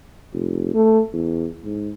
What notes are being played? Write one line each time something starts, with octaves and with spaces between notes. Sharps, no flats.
F1
A3
E2
G#2